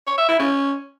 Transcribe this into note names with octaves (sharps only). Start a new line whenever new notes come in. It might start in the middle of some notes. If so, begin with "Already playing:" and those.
C#5
E5
E4
C#4